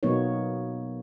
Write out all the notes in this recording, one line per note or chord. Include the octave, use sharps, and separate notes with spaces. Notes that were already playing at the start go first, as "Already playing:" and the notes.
B2 F#3 A#3 B3 D#4 C#5